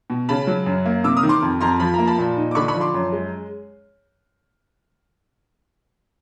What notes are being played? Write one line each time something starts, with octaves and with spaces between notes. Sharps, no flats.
B2
C#3 A5 B5
F#3
F#2
A#3
C3 D6 E6
D#6 F6
D#3
C6 D6
F2
F2 A#5 C6
F3 B5
A#3 A#5
A5 B5
A#2
D#4
D6
D3 B5 C#6
B5 C#6
F3
C6 D6
F#2
G#3